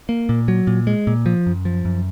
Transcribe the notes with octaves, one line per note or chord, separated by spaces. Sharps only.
A#3
A#2
F#3
A#2
G#3
A#2
F3
F#2
F3
F#2